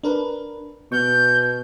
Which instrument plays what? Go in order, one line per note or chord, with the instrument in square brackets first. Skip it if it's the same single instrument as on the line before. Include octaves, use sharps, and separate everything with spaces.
[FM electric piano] D4 A#4 B4
[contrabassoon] B2 [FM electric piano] C#6 F6 [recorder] G6